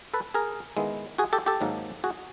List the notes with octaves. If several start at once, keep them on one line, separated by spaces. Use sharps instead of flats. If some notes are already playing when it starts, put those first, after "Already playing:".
A4 B4
G#4 A#4
D#3 G#3 B3 E4
F#4 G#4
G4 A4
G4 A4
G#2 D#3 F#3 A#3
F#4 G#4